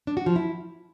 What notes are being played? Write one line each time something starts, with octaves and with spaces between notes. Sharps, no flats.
D4
F#4
F3
E4